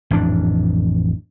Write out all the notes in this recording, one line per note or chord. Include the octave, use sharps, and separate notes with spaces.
A1 F2 G#2 D4